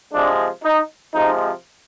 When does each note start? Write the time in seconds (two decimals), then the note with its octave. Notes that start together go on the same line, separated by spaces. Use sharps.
0.13 C3 F3 G#3 D4
0.64 D#4
1.14 C3 F3 G#3 D#4